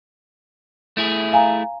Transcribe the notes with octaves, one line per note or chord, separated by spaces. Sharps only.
A3 E4 G#4
F5 G#5 A#5